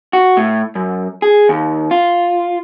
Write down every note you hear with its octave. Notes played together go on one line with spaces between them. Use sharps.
F#4
A2
F#2
G#4
D#2
F4